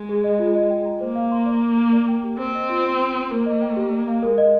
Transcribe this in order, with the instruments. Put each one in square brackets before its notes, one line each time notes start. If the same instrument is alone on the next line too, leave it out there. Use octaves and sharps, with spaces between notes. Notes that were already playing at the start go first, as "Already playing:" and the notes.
Already playing: [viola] G#3
[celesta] G#4
D#5
F4
D#5
G5
A#5
[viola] A#3 [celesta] C5
[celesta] F5
C6
D5
F5
A#4
D5
G5
G4
[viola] C4 [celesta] C5
[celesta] D#5
F4
G5
C6
C5
[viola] A#3 [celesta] A#4
[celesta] D#5
G5
G4
D5
F5
[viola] G#3 [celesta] A#4
[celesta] D#5